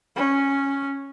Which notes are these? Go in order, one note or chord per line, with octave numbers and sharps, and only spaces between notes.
C#4